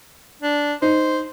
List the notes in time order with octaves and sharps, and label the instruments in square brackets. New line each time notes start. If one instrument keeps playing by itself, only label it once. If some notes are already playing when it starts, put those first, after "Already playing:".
[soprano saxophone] D4
[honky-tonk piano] D#4 [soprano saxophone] C5